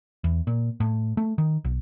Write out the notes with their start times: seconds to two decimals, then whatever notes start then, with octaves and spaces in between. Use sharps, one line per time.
0.24 E2
0.47 A#2
0.80 A2
1.17 A3
1.38 D#3
1.65 B1